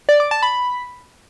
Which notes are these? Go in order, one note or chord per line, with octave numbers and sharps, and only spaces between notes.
D5
D6
A5
B5